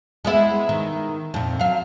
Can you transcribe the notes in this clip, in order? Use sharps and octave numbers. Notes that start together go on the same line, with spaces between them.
G#3 B3 E4
D#3
F2 A#2
F#3 F5